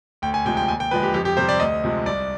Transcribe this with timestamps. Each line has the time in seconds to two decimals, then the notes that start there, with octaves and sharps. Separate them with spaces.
0.22 D2 G5
0.34 G#5
0.45 C3 F3 G#3 G5
0.57 G5
0.68 D#2 G#5
0.80 G5
0.91 D3 F3 G#3 B4
1.03 G4
1.14 F2 G4
1.25 G4
1.37 C3 G3 C5
1.48 D5
1.60 D2 D#5
1.84 C3 F3 G#3
2.06 C2 D5